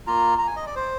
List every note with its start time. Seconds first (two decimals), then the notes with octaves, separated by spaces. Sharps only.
0.07 A#3 F4 A#5
0.38 A#5
0.47 G#5
0.56 D#5
0.66 D5
0.76 C5